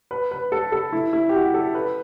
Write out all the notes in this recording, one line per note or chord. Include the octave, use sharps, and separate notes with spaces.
B4
B4
A4
A4
E4
E4
G4
F#4
A4
B4